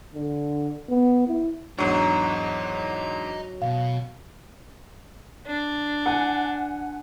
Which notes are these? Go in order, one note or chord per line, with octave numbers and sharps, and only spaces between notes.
D3
B3
E4
E2 G#2 F#3 D4 D#5 A#5
B2 F5
D4
F#5 G#5